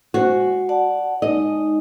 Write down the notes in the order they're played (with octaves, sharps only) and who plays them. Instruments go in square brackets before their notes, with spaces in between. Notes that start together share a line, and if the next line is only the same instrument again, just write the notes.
[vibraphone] G#3 C5 [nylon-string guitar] F#4
[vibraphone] D5 F#5 A5
[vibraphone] G#3 D#4 [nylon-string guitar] D#5